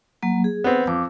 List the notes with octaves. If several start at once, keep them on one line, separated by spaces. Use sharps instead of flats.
F#3 A#3
G#4
B3 C4
F2 D6